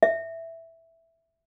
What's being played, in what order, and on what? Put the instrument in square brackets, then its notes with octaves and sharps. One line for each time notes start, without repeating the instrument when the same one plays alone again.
[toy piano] E5